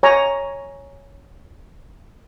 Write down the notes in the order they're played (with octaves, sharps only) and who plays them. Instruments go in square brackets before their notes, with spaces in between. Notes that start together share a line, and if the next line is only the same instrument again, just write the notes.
[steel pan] C#5 G#5 A#5